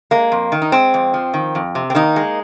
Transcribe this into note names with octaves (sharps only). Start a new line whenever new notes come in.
G#3 A#3
F2
D#3
D#4
G#3 C4
F2
F3
D#3
F2
C3
C4
D#3 A#3 D#4
G#3